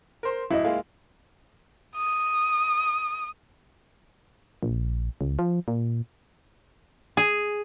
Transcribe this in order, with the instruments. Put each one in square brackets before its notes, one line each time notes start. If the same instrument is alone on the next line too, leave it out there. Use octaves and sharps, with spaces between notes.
[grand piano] A#4 C5 C6
[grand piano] D1 [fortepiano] E4 D#5
[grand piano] G#3 A#3 F4
[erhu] D#6
[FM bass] A#1
C#2
F3
A#2
[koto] G#4